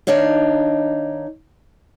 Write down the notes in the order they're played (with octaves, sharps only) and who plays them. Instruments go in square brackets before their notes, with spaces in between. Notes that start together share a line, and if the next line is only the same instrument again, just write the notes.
[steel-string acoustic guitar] D#3 D4 D#4 C#5 F5